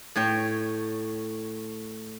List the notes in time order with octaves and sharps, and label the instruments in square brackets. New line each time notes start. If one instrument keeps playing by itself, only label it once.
[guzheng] A2 C#5 G5